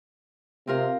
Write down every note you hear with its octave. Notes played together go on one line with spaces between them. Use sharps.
C3 C4 F4 A#4